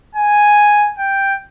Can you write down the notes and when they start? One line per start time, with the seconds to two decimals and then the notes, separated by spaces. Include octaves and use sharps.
0.15 G#5
0.98 G5